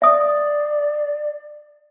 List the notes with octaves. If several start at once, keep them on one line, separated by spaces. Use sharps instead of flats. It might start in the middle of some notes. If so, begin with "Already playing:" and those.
D5 E5 D#6